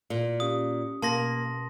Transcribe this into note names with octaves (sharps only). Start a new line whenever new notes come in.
A#2
C#4 G4 F5 D#6
B2 A#3 A5 C6 A#6